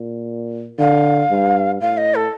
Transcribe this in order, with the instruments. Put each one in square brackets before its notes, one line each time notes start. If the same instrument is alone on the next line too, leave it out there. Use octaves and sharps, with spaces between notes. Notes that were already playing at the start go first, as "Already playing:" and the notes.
Already playing: [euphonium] A#2
[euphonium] D3 [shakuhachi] F5
[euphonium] G2
[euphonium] A2 [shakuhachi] F5
[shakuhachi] D#5
A4